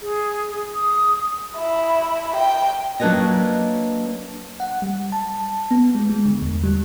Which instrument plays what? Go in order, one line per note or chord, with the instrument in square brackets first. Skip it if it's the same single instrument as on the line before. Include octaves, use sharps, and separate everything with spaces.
[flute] G#4
D#6
[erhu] E4
G5
[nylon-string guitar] F#3 A#3 D4 B4 C#5 D#5
[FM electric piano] F#5
G3
A5
B3
G#3
G#3
D3
E2
G3